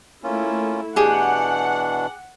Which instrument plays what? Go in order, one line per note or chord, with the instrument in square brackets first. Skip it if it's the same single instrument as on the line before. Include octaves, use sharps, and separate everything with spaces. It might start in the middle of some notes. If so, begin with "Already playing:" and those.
[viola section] A3 E4 [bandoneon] A#3 C#4 F4
[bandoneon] B2 E3 D4 [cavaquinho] G4 G#4 [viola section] F#5